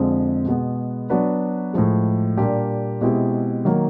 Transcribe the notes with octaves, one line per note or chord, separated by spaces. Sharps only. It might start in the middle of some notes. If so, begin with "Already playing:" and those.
Already playing: F2 D3 F3 G#3 C4
B2 G#3 B3
F#3 B3 D4 F#4 B4
A2 F3 G#3
A#2 G3 A#3 D4 G4
B2 G#3 C4 E4 G4
D#3 F#3 A#3 D#4